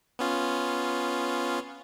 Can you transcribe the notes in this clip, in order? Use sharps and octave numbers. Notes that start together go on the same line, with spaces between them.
B3 C#4 F4